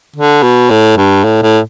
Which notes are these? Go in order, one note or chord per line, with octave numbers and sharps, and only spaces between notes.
D3
B2
A2
G2
A2
A2